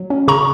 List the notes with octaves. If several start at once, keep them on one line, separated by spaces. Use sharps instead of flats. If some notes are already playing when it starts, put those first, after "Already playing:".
Already playing: F#3
C#4
C#3 A#5 C#6